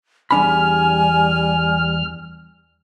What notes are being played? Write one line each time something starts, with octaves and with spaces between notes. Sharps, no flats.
E2 G3 D4 G#5 B5 F6